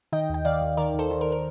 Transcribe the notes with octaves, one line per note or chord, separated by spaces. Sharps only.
D#3 D#5 G5
D#2 G5
D#3 D5 F5
D#2
D#3 A#4 D5
D#2 A4 C5
D#3
A#4
A#4